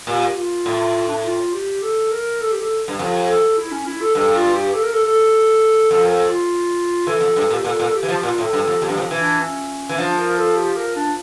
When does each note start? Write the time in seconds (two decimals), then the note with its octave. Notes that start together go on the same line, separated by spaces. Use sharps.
0.07 A#2 G4
0.37 F4
0.66 A2
1.07 D4
1.15 E4
1.24 F4
1.53 G4
1.82 A4
2.11 A#4
2.41 A4
2.52 G4
2.60 A4
2.88 G2
2.99 F2
3.28 A4
3.57 E4
3.71 C#4
3.86 E4
4.01 A4
4.15 G2 A4
4.35 F4
4.54 G4
4.74 A4
4.83 A#4
4.92 A4
5.03 A4
5.90 F2 A4
6.05 A#4
6.10 A4
6.29 F4
7.07 E3 A4
7.21 F2
7.36 G2
7.50 A#2
7.53 G4
7.65 A#2 A4
7.80 A#2
7.88 A4
7.95 G4
8.03 E3
8.08 F3
8.18 G4
8.23 A#2 F4
8.38 A2
8.43 A4
8.53 G2
8.62 A4
8.68 F2
8.82 F2 G4
8.89 G2
8.98 F2
9.11 E3
9.20 D4
9.40 C#4
9.89 E3
9.98 F3 D4
10.18 A#4
10.37 A4
10.56 G4
10.76 A#4
10.96 D4